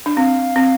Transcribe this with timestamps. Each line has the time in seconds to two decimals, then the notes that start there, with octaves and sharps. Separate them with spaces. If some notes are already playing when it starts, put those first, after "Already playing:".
0.06 D4
0.17 C4 F5
0.56 C4